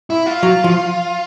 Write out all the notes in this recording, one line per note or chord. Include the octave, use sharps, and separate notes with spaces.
E4
F4
F#3
F3